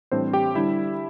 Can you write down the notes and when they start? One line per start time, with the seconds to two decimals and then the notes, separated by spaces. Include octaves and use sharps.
0.12 A2 E3 G3 C4 D4 C5
0.33 G4 G5
0.55 D3 G3 D4 E4 E5